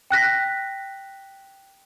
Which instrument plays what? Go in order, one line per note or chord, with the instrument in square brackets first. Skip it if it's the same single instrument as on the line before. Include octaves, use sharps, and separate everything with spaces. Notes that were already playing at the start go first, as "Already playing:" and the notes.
[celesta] G5 F#6 A#6 B6